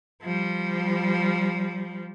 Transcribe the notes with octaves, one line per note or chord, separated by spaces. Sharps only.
F3 G3